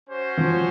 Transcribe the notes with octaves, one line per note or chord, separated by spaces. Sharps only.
C#4 F#4 C5
F3